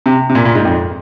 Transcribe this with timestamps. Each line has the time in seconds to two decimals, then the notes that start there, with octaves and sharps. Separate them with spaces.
0.06 C3
0.29 C3
0.35 A#2
0.45 A#2
0.55 G#2
0.65 F2